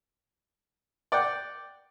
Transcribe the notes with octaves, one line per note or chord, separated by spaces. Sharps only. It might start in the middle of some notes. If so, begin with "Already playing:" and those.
D5 F#5 G5